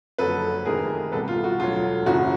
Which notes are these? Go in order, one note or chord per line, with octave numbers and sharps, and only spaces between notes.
F#1 F2 D3 F#3 A4 B4
F1 F2 C3 D#3 G#4 A#4
C2 B2 G3 A4 B4
F4
F#4
E1 D2 D3 F#3 F4
F#1 F#2 C#3 E3 F#4